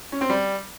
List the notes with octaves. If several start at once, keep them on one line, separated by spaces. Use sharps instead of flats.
C#4
C4
G3